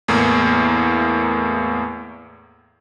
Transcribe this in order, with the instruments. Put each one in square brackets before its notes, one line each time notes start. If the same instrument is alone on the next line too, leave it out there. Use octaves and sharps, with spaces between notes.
[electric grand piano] E2 A2 A#3